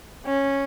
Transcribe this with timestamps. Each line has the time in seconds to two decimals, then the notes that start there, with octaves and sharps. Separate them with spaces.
0.26 C#4